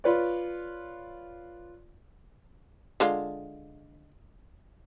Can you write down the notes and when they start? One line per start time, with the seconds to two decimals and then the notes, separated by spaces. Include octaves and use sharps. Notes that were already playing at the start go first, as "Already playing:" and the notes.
0.04 F4 B4 C#5 D5
3.00 D3 G#3 F4